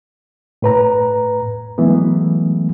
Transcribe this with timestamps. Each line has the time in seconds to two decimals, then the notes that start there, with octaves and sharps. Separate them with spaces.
0.62 A2 B4 A#5
1.78 E3 F#3 G#3 A3 B3